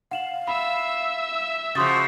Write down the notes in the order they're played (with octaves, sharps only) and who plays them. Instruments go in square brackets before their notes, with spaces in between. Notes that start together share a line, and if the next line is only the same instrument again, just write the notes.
[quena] F5 [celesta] F#5 E7 F#7
[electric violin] E5 E6 [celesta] B5
[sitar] C#3 F3 [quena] F#4 [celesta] C6 D#6 A6